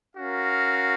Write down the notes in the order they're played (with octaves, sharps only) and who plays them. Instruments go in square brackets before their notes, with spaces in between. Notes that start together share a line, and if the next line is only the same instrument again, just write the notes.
[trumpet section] C#4 F#4 A#4 F5